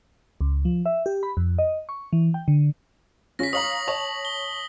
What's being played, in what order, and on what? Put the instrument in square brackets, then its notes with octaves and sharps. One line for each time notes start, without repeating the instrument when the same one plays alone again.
[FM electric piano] C#2
F3
E5
G4
B5
F2
D#5
C#6
E3
G5
D3
[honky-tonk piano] C#3 C#4 F4 [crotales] A#6 B6
[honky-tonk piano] C#5 F5 A#5 [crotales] D#6 F#7
[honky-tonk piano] C#5 A5 F7
[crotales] G7